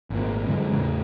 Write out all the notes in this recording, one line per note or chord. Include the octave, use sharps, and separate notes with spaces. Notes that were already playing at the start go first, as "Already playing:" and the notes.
G#1 A#2
F#2 D3 E3 G#3
E2 A2 C#3